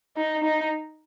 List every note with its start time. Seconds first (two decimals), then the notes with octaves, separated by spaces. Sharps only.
0.17 D#4
0.44 D#4